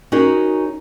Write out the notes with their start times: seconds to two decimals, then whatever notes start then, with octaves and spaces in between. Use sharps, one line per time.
0.12 C#4 D#4 F#4 G#4 A#4